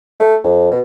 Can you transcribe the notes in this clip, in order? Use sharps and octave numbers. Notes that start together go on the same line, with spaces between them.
A3
F2
B2